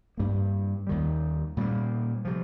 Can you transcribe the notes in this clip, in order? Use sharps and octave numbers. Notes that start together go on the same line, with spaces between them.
G2 G3 A#3
D#2 D#3 G3
A#2 G3 A#3
C3 F3